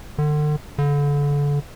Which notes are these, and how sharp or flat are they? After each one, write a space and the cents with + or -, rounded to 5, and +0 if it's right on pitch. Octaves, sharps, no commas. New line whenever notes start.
D3 +35
D3 -30